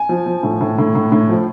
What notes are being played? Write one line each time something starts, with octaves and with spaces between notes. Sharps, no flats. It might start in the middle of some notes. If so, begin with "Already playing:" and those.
Already playing: G#5
F3
F3
A2
A2
A2
A2
A2
F3